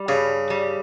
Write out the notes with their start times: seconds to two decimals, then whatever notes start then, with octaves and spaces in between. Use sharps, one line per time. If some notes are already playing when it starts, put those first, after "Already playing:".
Already playing: G3
0.08 G2 C#3
0.50 G3